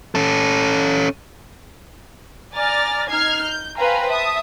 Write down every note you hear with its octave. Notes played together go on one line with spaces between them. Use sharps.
C#4 A4
D5 G#5 A#5 F6 A6
D#4 F6 G#6 C7
G6
B4 C5 F5 G5 G#5 A#5
E5 A5 D#6